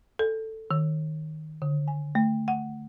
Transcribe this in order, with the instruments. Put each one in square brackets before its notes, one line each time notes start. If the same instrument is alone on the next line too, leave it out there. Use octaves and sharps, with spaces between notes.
[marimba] A4
D#3
D3
G#5
A3
F#5